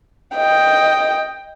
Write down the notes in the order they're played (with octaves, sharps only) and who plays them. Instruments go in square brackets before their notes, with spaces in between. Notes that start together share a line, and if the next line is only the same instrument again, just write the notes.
[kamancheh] D#5 G5